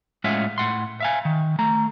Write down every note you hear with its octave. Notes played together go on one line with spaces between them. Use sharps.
A2 G#3 C#4 F4 E5 F#5
A2 F#5 C6
E5 F5 G#5
D#3
A3 A#5